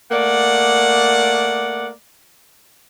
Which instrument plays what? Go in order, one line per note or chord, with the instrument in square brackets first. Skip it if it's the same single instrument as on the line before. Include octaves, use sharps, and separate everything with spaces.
[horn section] A3 A#3 D5 F#5